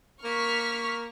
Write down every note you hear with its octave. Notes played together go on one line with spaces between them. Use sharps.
A#3 C#6 F6 B6